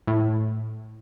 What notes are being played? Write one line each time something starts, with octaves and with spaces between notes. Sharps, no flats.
A2